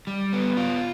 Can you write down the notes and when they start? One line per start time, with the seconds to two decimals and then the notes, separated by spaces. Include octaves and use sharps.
0.07 G3
0.33 B3
0.57 F4